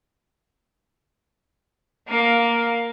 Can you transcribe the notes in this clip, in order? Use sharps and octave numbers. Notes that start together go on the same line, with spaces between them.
A#3 F5